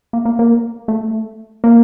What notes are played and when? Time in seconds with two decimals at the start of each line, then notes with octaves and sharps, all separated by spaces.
0.13 A#3
0.25 A#3
0.39 A#3
0.88 A3
1.64 A#3